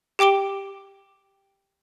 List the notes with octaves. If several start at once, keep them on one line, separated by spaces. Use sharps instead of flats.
G4 G5 D6 D7 G7